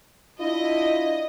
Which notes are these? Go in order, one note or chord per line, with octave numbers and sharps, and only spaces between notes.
D4 E4 F4 D#5